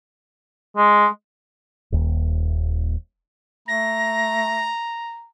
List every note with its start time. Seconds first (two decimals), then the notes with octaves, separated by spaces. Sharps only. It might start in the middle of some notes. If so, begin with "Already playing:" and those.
0.76 G#3
1.92 D#1 D#2
3.68 A3 A#5 A#6